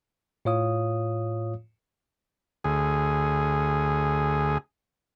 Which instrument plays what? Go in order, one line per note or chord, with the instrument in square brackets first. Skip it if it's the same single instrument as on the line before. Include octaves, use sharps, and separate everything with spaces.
[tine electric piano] A2 F4 C#5 F5 D#6
[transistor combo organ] D2 G#4